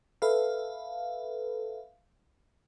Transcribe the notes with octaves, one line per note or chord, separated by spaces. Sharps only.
A4 B4 E5 F5